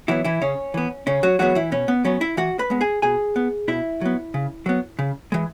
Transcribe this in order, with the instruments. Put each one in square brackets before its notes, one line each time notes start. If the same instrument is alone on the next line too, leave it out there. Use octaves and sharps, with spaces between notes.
[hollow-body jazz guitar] E3 F#3 B3 E4
E3 E4
C#3 C#4
E3 B3
C#3 C#4
F#3 F#4
E3 F#3 G#3 B3 F#4
E3 E4
B2 C#4
B3
F#3 B3 C#4
E4 E5
E3 F#4 F#5
B4 B5
G#3 B3
G#4 G#5
B2 G#4 G#5
B3
B2 E4 E5
F#3 B3
C#3
F#3 B3
C#3
E3 G#3